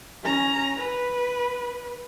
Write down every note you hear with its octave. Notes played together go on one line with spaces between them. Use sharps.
C#4 A#5
B4